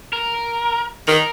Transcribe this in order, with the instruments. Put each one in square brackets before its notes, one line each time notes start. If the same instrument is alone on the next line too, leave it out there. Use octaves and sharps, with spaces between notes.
[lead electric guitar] A#4
[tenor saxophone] D#3 [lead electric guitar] A#4